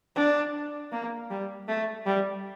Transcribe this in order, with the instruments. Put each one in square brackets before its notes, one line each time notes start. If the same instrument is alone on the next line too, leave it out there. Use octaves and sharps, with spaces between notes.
[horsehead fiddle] D4
A#3
G3
A3
G3